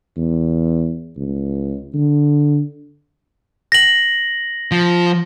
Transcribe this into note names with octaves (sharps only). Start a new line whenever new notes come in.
E2
C#2
D3
A#6 F#7
F3